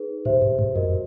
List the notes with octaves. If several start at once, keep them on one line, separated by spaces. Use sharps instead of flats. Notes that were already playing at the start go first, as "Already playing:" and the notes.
Already playing: D#4 G#4 B4
A#2 G4 C5 E5
A2
A2
F#2 F#4 A#4 D#5